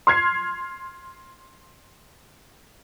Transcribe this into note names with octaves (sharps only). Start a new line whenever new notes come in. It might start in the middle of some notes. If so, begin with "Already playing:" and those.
C6 F6 G#6 C7